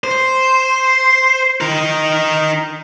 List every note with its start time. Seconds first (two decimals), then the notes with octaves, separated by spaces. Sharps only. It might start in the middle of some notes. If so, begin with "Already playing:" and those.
0.04 C5
1.61 D#4 A#4